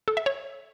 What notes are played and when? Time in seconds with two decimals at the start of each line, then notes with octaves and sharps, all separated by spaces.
0.08 A4
0.17 E5
0.26 C#5